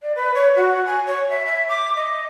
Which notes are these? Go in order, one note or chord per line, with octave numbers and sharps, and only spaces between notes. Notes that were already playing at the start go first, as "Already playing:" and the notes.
D5
B4
C#5
F#4
G#5
C#5
E5
E5
D6
D#5